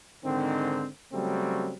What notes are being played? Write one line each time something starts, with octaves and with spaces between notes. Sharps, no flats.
G#2 D3 D#3 C4
C#3 F#3 G3 A3 C4